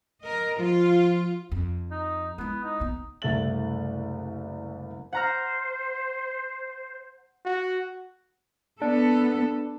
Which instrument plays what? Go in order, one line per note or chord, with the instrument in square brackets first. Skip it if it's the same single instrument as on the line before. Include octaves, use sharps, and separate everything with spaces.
[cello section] A#4 D#5
[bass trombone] F3 [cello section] F4
[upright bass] F2
[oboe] D#4
[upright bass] G#3 E4 [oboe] B3
[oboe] D#4
[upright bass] B1 B3
[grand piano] F#1 C2 A3 E5 A6 F#7
[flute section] C5 [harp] F#5 A#5 F6
[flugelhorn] F#4
[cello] B3 A4 [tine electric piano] D4